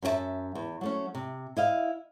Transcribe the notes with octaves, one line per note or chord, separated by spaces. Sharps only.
F#2 C#4 F#4 E5 A5
E2
F#3 A3 C#4
C3
E4 D#5 F5